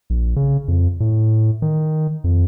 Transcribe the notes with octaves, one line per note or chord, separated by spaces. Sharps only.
A#1
C#3
F2
A2
D#3
F2